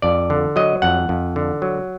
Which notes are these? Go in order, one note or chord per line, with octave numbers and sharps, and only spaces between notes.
F2 D5
D3
F#3 D#5
F2 F#5
F2
D3
F#3